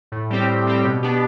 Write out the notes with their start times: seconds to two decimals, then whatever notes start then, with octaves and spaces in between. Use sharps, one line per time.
0.12 A2
0.30 G3 C4 G4
0.48 A2
0.67 G3 C4 G4
0.85 B2
1.03 B3 D4 G4